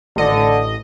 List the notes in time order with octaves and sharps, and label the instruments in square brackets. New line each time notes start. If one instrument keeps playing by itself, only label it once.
[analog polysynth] A1 D#5 [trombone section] D3